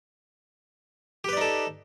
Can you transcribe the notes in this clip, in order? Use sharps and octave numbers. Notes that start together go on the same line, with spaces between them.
D#4 G4 A4 B4 D5